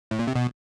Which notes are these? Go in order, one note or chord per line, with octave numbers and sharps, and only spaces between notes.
A2
A#2
C3
B2